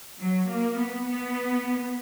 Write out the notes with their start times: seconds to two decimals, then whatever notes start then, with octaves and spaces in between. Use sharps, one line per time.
0.20 F#3
0.49 A#3
0.77 B3
1.06 B3